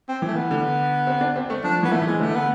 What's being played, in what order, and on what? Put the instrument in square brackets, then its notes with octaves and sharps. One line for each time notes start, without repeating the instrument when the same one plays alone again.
[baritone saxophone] C4
[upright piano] E3 [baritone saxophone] A3
[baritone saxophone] B3
[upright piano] D3
C4
D4
C4
A3
[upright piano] F3 [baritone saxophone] D4
[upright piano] E3 [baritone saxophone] B3
[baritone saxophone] A3
[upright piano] E3 [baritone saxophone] G#3
[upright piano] D3 [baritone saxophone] A3
[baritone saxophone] B3